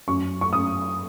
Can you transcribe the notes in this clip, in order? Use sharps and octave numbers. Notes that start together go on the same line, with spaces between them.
F#2 C#6
C#6
F#2 D#6